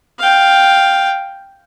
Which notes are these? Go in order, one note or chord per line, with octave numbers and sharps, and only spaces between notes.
F5 G5